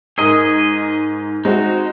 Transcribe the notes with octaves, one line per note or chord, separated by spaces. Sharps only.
G#2 G#4 A#4 D#5
G#3 C4 D#4 F#4